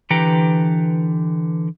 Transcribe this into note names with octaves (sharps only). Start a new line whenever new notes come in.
D3 E3 G4 B4 G5 A#5